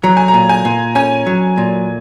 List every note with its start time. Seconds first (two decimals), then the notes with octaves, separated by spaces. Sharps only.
0.03 F#3 A#5
0.17 G#5
0.28 A#5
0.34 A#2
0.49 G#5
0.65 A#2
0.95 C#4 G#5
1.27 F#3
1.58 A#2